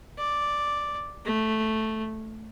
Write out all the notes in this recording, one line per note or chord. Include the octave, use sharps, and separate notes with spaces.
D5
A3